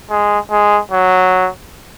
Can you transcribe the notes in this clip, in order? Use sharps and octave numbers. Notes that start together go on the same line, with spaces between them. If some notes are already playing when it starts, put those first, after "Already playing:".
G#3
G#3
F#3